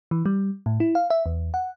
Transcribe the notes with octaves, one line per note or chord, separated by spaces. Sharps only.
E3
G3
A2
E4
F5
E5
E2
F#5